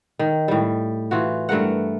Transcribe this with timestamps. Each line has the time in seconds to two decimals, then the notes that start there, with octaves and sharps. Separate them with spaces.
0.19 D#3
0.48 A2 G3
1.11 E3 F4 F#4
1.49 G2 A3 A#4 F#5